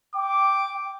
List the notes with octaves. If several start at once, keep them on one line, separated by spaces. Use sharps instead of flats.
G5 D6